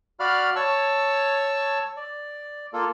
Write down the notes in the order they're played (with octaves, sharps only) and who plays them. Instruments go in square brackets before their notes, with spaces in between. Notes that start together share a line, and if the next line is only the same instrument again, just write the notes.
[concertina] F#4 D5 F5 B5 F6
C#5 A5 C#6 E6
D5
A#3 F4 A4